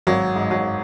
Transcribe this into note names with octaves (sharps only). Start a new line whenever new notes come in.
G#1 F#3
G#2
F#3